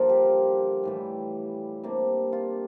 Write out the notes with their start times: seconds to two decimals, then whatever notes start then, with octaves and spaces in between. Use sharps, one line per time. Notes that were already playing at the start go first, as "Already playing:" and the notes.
Already playing: G2 D3 F3 A#3 F4 A#4
0.09 G4
0.83 A2 E3 G3
1.83 C3 G3 A#3 D4
2.33 F4